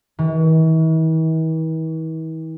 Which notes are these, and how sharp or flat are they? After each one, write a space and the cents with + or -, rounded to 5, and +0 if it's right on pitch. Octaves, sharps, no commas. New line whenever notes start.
E3 -45